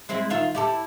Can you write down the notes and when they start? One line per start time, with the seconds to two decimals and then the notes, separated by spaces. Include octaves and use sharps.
0.09 G#3 C4 E4
0.30 D#3 F4 E5
0.55 E4 G4 A4